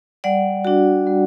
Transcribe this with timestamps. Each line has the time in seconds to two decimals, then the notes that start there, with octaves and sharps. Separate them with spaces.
0.24 G3 D5 F#5
0.65 D4 F#4
1.07 G3